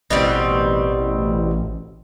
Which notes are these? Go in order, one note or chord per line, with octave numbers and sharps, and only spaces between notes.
A1 B2 G3 C4